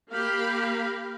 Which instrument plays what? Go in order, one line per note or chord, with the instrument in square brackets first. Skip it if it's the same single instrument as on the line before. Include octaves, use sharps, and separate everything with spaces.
[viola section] A#3 G4 F5 B5